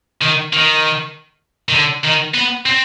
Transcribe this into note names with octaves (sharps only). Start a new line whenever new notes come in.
D#3
D#3
D#3
D3
D#3
B3
C4